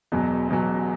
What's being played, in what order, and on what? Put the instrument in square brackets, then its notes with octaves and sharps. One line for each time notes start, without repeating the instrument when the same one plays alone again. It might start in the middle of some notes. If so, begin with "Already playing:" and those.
[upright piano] E1 E2 B2 F#3
E1 E2 B2 F#3